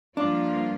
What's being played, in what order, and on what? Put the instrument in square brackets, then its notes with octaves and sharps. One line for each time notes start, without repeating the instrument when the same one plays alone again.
[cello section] G2 F3 A#3 F4 [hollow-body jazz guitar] D4